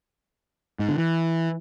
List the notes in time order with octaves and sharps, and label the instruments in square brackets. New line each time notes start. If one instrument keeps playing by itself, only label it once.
[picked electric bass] G#2
D3
E3